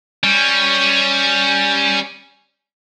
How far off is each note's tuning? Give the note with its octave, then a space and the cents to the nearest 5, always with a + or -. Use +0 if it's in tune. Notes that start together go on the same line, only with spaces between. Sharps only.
G3 +0 C#4 +0